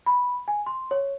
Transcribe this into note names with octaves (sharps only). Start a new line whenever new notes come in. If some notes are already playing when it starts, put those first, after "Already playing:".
B5
G#5
C6
C#5